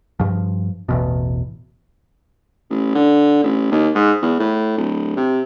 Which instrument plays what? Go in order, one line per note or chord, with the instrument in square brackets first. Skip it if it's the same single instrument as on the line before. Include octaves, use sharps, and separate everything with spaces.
[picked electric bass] G2 F3
A1 E2 B2
[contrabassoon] A1
D3
A1
D#2
G#2
E2
A2
D1
C3